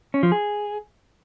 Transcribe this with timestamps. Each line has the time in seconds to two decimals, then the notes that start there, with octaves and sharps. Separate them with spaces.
0.14 C#4
0.23 F3
0.32 G#4